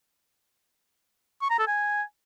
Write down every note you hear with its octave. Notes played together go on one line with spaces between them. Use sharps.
C#6
A#5
A4
G#5